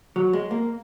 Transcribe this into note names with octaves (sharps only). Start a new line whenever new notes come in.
F#3
G#3
A#3